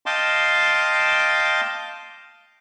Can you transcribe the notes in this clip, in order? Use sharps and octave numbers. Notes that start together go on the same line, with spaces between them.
D#5 F5 G5 A5 C6 D6